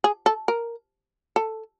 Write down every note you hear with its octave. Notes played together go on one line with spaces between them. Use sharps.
G#4
A4
A#4
A4